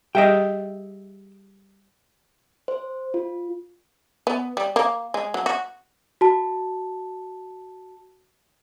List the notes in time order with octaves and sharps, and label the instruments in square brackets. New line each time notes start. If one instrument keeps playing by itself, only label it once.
[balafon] G3 G4 G#4 [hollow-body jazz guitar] D#5 E5 G5
[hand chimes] C5
F4
[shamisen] B3
G3
A#3
G#3
F#3
F#4
[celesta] F#4 A5